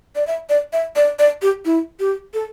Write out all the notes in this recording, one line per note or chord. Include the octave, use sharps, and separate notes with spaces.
D5
E5
D5
E5
D5
D5
G4
E4
G4
A4